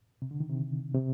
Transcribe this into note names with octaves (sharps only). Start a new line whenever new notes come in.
C3
D3
D#3
C3
C3